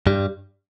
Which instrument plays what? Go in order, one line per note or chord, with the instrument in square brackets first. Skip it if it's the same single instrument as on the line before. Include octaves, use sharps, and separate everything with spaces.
[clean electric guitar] G2 G3